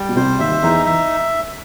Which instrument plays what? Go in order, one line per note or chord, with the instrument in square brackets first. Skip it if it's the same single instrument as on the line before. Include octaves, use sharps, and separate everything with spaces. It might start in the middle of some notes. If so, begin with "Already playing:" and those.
Already playing: [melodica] G3
[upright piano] B2
[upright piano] C2 C3 [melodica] C5
[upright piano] D#2 D#3 [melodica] E5
[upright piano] E2 E3 [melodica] D#4
[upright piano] E3 [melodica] E5